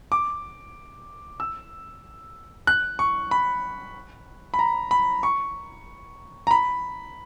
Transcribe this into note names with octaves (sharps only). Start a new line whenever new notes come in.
D6
E6
F#6
C#6
B5
B5
A#5
B5
C#6
A#5
B5